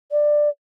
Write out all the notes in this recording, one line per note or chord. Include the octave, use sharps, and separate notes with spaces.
D5